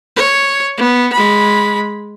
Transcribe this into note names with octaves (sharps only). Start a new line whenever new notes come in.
C#5
B3
G#3 B5